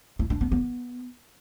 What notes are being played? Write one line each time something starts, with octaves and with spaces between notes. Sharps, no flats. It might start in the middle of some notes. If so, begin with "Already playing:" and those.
E4
D4
B3
B3